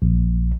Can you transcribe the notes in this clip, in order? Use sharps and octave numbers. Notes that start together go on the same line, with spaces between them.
A#1